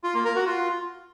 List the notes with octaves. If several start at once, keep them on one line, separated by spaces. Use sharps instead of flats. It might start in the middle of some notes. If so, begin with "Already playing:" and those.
F4
A#3
A#4
F#4
F4